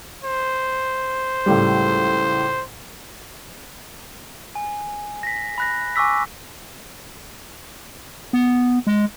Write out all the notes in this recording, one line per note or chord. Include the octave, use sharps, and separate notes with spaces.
C5
C#2 A2 G3
G#5
A#6 B6
B5 F#6 A#6
G#5 C#6 D6 E6 B6
B3
G#3